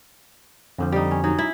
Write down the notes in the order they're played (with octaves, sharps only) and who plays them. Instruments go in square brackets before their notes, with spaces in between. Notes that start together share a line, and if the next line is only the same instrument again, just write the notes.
[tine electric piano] F2 D3 F3
[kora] G3 D#4
C#4
F#3 D#4
E4